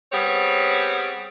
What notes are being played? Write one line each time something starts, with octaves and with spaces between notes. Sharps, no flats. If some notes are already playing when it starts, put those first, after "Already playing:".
G3 B3 C4 G#4 C#5